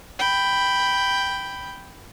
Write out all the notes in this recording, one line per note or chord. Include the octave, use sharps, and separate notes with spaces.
G5 B5